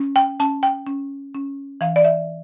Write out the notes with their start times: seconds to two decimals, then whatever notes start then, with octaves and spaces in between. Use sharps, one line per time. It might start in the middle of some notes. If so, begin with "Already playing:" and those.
Already playing: C#4
0.16 G5
0.40 C#4 A5
0.63 G5
0.87 C#4
1.34 C#4
1.81 E3 F5
1.96 D5
2.04 E5